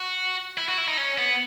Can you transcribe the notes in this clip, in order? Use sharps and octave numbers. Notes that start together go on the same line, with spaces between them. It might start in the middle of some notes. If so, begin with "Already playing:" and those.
Already playing: F#4
E4
F#4
E4
D#4
C#4
B3